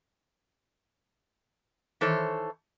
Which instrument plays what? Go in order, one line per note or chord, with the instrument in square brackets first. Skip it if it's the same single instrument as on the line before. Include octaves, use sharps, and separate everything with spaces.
[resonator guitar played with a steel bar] D#3 E3 A4 C5 C#5